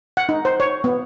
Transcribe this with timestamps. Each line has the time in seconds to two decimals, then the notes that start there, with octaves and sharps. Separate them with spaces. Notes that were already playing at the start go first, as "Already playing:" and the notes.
0.17 F#5
0.29 D#4
0.45 C5
0.60 C#5
0.84 B3